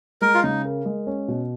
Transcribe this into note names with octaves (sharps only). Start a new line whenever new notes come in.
G#3 A#4
F4
C#3 D#4
A#4
G#3
C#4
B2